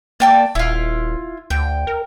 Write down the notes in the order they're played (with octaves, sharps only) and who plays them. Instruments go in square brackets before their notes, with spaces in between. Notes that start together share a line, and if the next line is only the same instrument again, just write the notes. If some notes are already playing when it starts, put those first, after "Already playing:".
[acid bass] A#3 [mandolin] D5 G5 A5
[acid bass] D#1 [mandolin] E4 F4
[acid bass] D2 [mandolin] G5
[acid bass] A#4